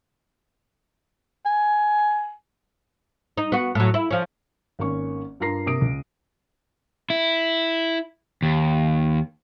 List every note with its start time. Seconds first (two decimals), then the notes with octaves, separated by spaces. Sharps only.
1.46 G#5
3.37 D#4
3.52 B3 F#4
3.75 A2 F#3
3.94 E4
4.11 F3 C#4
4.79 G#1 A#3 C#4 C#6
5.40 G2 F4 A#4 A#5 A#6 C7
5.66 C3 A#3 D#6 D7
5.81 C#2
7.10 E4
8.42 D#2